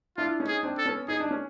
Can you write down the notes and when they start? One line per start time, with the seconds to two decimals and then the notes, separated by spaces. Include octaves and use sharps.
0.17 D4 E4 F4
0.40 C#4 D#4
0.48 G#4
0.63 C4 D4
0.78 A4
0.86 B3 C#4
1.08 D#4 G#4
1.20 D4
1.31 C#4